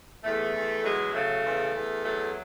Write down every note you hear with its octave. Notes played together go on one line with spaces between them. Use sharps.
E2 A3
E2
F#3 G#3
C#3 A3
E2
E2
F#3 A3